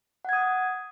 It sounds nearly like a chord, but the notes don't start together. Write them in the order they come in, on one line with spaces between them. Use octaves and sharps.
F#5 G#6 D#6